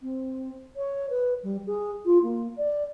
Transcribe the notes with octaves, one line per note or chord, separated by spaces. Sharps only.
C4
C#5
B4
G3
G#4
F4
A#3
D5